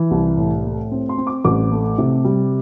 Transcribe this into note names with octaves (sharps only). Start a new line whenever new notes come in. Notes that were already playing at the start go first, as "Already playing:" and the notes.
Already playing: E3
C2
A2
A3
C4
C6
C4
D6
A1 D6
A3
C3
G3